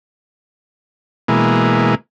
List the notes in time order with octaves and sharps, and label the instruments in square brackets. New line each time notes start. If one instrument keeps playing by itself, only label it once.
[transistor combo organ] B2 E3 G#3 A#3